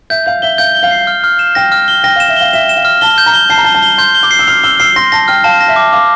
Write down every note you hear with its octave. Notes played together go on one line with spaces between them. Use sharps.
E5 G6
F5 G6
E5 G7
F5 G6
G7
F5
C7
F6
F6
E7
G5 A#6
F6
G7
G5 A#6
F5
E7
E5
F5 G7
E5 E7
E7
F5
F6
A5 G7
G6
A#5
G7
A5 C7
A#5
A5 G7
A5
G7
C6 G6
G7
D6
C7
E6
F6 C7
E6 G7
E6 C7
C6 A#6
A5 A#6
G5 F6
F5 A5
A#6
E5
D6
F5 D6